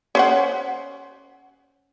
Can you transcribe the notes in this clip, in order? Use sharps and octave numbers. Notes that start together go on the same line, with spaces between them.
C#4 C5 F#5